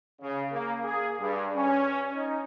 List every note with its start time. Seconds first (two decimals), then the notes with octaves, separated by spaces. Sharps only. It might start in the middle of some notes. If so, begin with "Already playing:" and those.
0.21 C#3
0.53 A#3
0.85 G#4
1.20 G2
1.56 C#4
2.15 D#4